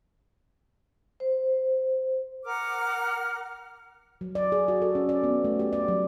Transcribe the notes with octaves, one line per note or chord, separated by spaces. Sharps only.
C5
A#4 F#5 D6 F6
F#3
D5
G#4
F#4
A4
C#4
D5
B3
A3
G4
D5
F#3